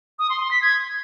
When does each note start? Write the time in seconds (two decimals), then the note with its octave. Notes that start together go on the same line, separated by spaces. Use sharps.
0.19 D#6
0.30 C6
0.40 C6
0.51 B6
0.62 G#6